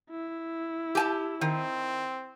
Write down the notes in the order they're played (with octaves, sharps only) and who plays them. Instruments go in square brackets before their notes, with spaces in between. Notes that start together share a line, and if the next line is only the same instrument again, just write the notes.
[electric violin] E4
[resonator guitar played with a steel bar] G4 G#5 A5
[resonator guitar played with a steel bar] D#3 [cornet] C4